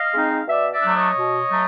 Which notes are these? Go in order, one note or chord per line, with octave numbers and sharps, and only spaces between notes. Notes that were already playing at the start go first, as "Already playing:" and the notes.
Already playing: D#5 F5
G#3 C4 D#4
B2 D5 E5
D5 E5
F#3 A3 D4
C#5 D#5
B2
F#3 A3